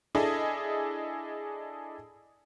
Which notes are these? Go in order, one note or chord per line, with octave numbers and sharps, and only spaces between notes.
D4 E4 G#4 A4 D#5